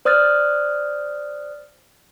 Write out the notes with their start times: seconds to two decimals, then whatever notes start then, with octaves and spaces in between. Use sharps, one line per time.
0.05 C5 D5 D#6 F6 F#6 A6